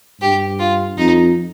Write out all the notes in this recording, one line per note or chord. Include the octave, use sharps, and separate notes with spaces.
G2 G4
F4
F2 D#4